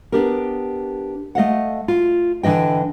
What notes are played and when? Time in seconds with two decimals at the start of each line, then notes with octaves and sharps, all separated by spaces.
0.12 B3 D4 G4 A#4
1.35 A3 D#5 F5 F#5
1.88 F4
2.43 D3 E3 D4 D#5 G5